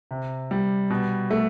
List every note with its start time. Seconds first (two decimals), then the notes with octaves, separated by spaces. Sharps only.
0.11 C3
0.51 G3
0.90 B2
1.31 A3